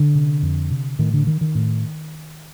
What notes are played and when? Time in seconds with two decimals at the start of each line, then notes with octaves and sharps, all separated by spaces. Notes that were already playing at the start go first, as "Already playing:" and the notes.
Already playing: D3
0.15 C3
0.42 F2
0.70 C3
0.99 A2 D#3
1.14 D3
1.27 D#3
1.41 D#3
1.55 A2